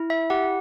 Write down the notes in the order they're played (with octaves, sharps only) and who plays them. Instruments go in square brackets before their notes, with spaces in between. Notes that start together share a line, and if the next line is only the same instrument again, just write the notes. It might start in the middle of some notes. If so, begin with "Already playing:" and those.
Already playing: [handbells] E4
E5
G4 F#5